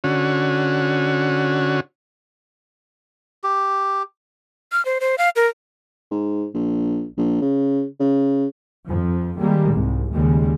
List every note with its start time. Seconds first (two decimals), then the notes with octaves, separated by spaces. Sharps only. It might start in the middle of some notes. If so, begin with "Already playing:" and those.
0.04 D3 C#4 F#4
3.44 G4
4.72 F6
4.85 C5
5.01 C5
5.18 F5
5.36 A#4
6.11 G#2
6.54 A#1
7.17 A#1
7.41 C#3
8.00 C#3
8.87 F2 F3
9.38 D#3 G3 G#3 A#3
9.72 C2 G#2
10.13 D#2 C#3 G3 G#3